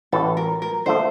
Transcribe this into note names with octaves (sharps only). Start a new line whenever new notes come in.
A1 A2 E3 A4
A#4
A#4
D3 F3 A3 C5